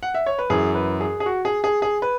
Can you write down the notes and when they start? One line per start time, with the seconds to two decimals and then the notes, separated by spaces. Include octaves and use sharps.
0.03 F#5
0.15 E5
0.26 C#5
0.39 B4
0.50 F#2 E3 G#4
0.75 B4
1.01 G#4
1.20 G#4
1.26 F#4
1.45 G#4
1.64 G#4
1.82 G#4
2.02 B4